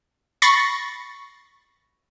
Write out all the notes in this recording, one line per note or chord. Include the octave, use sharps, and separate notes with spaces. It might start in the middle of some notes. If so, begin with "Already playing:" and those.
B5 C#6 A6 A#6 C7